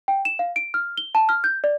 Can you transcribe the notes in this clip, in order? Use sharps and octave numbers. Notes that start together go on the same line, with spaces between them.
G5
E7
F5
D7
F6
G7
A5
F6
G6
D5